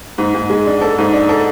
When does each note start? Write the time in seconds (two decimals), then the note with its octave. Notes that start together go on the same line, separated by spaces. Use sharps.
0.18 G#2
0.34 G#2
0.50 G#3
0.66 D4
0.81 A4
0.98 G#2
1.13 D4
1.29 A4